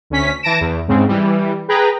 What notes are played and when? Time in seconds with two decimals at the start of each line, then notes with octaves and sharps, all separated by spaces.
0.10 D2 C#4 B6
0.42 E3 A5 A#6 D7 E7
0.61 E2
0.88 G#2 C#3 C4
1.08 E3 G3
1.68 G#4 B4 G5 A#5